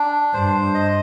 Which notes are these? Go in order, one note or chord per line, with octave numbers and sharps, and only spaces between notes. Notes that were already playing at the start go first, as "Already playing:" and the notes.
Already playing: D4
G2 C5
D#5